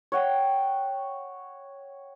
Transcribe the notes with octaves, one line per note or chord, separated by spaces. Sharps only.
C#5 F#5 G5